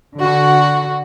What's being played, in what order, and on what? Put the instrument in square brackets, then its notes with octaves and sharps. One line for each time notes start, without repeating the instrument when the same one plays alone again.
[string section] D3 F#4